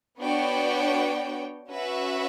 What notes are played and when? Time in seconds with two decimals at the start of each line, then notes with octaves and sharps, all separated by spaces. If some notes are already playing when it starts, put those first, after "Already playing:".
0.21 B3 D4 F#4 C#5 G5
1.70 C#4 F#4 B4 E5